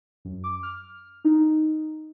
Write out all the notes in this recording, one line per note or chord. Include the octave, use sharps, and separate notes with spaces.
F#2
D6
F6
D#4